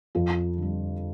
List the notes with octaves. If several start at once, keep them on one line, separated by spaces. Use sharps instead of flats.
F2 F4
D3 G3